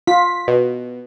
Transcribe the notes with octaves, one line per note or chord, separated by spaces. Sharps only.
F4 B6
B2